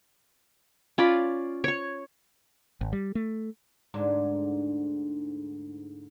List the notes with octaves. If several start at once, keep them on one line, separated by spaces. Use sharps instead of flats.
C#4 F4 D5 B5
C#5 C#6
G#1
G3
A3
D2 G#2 D4